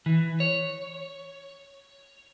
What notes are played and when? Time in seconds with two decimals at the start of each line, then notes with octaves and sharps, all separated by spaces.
0.06 E3
0.40 C#5